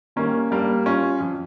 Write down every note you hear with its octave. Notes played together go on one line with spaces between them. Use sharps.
D#3 G3 A#3 C#4
G2 G3 A#3
G3 C#4 F4
F2